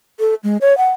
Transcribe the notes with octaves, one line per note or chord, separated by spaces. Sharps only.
A4
G#3
C#5
F#5